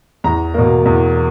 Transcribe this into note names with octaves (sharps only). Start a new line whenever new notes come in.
E2 A#5
B2 A#3
E2